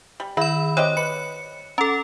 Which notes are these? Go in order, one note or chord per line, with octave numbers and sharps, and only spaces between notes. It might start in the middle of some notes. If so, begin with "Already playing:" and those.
G3
D#3 E4 B5
C4 G4 C#5 D#5
B4 C#7
C#4 A4 A#5